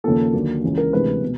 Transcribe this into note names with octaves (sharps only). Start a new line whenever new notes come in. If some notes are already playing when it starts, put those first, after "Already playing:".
D#2 C#3 F3 A#3 A4
D#2 D3 F#3 A#3
C#2 C#3 E3
A#4
D2 C3 E3 G#3 B4
B2